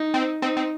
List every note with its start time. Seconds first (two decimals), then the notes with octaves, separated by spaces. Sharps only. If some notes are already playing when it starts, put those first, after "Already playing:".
Already playing: D#4
0.14 C4
0.42 C4 D#4
0.57 C4